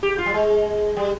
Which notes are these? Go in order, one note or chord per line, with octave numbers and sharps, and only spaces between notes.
G4
F4
G3
G#3
G3